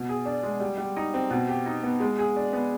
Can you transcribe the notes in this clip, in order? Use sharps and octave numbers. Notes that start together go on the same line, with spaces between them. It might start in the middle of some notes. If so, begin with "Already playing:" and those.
Already playing: B2
G#4
D4
G#3
G3
G3
D#4
C4
B2
G4
D#4
B3
G#3
G#4
D4
B3